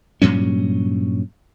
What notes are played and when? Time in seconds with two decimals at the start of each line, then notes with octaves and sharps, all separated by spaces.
0.22 G2 A#2 F#3 C#4